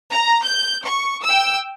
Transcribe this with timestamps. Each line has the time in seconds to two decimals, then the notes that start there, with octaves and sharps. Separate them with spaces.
0.12 A#5
0.44 G6
0.85 C#6
1.23 G5 E6